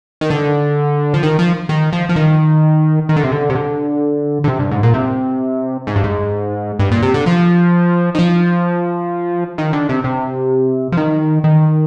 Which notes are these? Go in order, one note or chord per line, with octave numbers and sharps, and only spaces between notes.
D#3
D3
F3
D#3
F3
D#3
F3
F3
D#3
D#3
D3
C3
D3
C3
D3
D3
C3
G2
G#2
A#2
C3
G#2
G2
G#2
G2
A#2
C3
D3
F3
D#3
F3
D#3
D3
C3
C3
F3
D#3
D#3